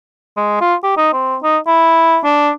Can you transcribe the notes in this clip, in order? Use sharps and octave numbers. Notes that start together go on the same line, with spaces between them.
G#3
F4
G4
D#4
C4
D#4
E4
D4